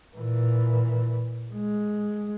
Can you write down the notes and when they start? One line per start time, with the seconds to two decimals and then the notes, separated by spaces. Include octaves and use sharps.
0.17 A#2 E3
1.53 G#3